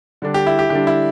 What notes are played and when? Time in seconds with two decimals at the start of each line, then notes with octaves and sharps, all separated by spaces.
0.22 D3 G3 D4
0.34 G4
0.47 E4
0.59 G4
0.70 D3 G3 D4 G4
0.87 E4